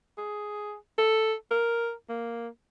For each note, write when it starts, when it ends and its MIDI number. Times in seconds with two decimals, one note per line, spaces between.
0.18 0.76 68
0.98 1.34 69
1.51 1.93 70
2.09 2.48 58